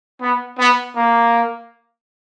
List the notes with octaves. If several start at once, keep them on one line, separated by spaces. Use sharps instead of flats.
B3
B3
A#3